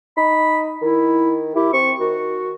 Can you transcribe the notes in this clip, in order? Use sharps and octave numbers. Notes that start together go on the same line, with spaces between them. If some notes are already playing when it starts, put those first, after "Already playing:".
D#4 B5
D#3 E4
E4 G4
C4 C#6
D#3 F#4